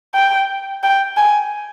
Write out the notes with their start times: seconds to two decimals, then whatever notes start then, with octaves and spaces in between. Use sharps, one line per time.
0.14 G5
0.83 G5
1.17 G#5